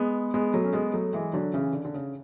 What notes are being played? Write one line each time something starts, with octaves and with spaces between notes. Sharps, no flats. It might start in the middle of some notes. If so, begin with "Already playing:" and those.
Already playing: G#3 B3
G#3 B3
F#3 A3
C#4
G#3 B3
F#3 A3
E3 G#3
D3 F#3
C#3 E3
D3
D3
C#3